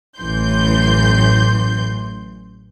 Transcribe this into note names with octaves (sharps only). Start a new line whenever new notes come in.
A1 F#2 E3 C6 G6